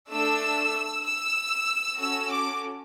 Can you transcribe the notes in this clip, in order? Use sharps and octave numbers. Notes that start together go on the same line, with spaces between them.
A3 D4 A4 E6
E6
C#4 F#4 A4 E6
D6